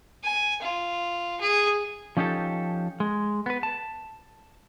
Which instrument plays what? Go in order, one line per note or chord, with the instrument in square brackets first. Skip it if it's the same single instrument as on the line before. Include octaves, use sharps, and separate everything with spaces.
[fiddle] G#5
F4
G#4
[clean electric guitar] F3 C#4 D#4 G4 A4
G#3
B3 B4
A5